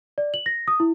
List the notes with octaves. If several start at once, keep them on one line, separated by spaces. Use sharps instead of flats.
D5
F#7
A#6
D#6
E4